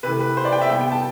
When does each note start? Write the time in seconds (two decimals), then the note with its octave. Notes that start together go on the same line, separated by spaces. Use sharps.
0.03 C3 E3 A3 B4
0.20 B4
0.37 C5
0.45 D5
0.52 G5
0.61 E5
0.69 C3 G3 B3 G5
0.81 G5
0.92 A5